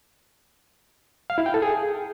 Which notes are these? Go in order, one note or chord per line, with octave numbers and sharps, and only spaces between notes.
F5
E4
G5
A4
G#4